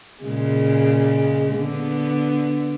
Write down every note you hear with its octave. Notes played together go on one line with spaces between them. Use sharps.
A#2 C#3 G#3
D3 B3